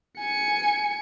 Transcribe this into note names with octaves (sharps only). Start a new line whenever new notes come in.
G#5 C#7